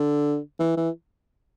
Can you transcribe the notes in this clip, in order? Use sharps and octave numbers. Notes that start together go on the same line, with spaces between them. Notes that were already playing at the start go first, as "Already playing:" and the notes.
Already playing: D3
E3
E3